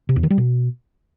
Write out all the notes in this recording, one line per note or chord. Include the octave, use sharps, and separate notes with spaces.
C3
E2
D#3
G3
B2